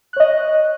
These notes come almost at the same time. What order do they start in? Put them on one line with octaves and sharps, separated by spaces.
F#6 C#5 D#5